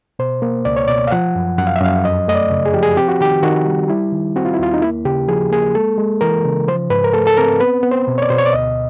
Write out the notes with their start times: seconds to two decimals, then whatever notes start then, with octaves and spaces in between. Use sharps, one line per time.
0.19 B2 C5
0.42 A#3
0.65 C#2 D5
0.76 C#5
0.88 B2 D5
1.07 F5
1.11 F3 F#5
1.35 F#2
1.58 F#2 F#5
1.67 F5
1.76 E5
1.81 F#2 F5
2.04 F2 D#5
2.28 A3 D#5
2.35 D5
2.50 C#3
2.66 G#4
2.74 F3 G4
2.83 G#4
2.97 C4 G4
3.08 F#4
3.21 D#3 G4
3.43 D#3 F#4
3.66 G3
3.89 G3 E4
4.12 D#3
4.36 C4 F#4
4.45 F4
4.54 E4
4.59 D#2 F4
4.74 D#4
4.82 A#3 E4
5.05 C#3 G4
5.28 F3 G#4
5.51 A#3 G#4
5.75 G#3 A4
5.98 G#3
6.21 E3 A#4
6.45 C#3
6.68 F3 C5
6.90 G#2 B4
7.04 A#4
7.14 A3 A4
7.27 A4
7.37 C4 A#4
7.60 B3 B4
7.83 B3
7.92 C5
8.07 B2
8.18 C#5
8.22 D5
8.30 B2 C5
8.38 C#5
8.46 D5
8.53 D2 D#5